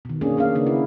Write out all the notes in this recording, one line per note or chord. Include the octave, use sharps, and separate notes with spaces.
B2 D#3
A#3 C#4 D4 G#4
A#3 C#4 G#4 F5
C#3 A#3 B3 D4
E4